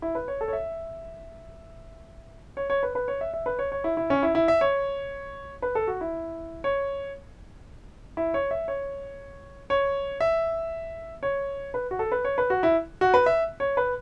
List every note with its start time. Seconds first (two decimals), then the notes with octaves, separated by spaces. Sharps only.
0.02 E4
0.15 B4
0.28 C#5
0.41 A4
0.48 C#5
0.53 E5
2.57 C#5
2.70 C#5
2.83 B4
2.95 B4
3.08 C#5
3.21 E5
3.34 E5
3.46 B4
3.59 C#5
3.72 C#5
3.84 E4
3.97 E4
4.10 C#4
4.23 E4
4.35 E4
4.48 E5
4.61 C#5
5.62 B4
5.75 A4
5.88 F#4
6.01 E4
6.64 C#5
8.17 E4
8.34 C#5
8.51 E5
8.68 C#5
9.70 C#5
10.21 E5
11.23 C#5
11.74 B4
11.91 F#4
11.99 A4
12.12 B4
12.25 C#5
12.38 B4
12.50 F#4
12.63 E4
13.01 F#4
13.14 B4
13.26 E5
13.60 C#5
13.77 B4